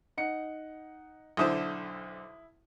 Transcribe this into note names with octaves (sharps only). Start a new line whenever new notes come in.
D#4 F#5 C#7
B1 D3 E4 C5 D#6